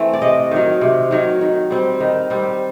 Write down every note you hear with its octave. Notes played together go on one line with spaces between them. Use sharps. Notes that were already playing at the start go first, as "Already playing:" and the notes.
Already playing: E3 A3 C4
D5
C3 D#5
D#3 F#3
C3
D#3 F#3
D#3
G3 C4
D#3
G3 C4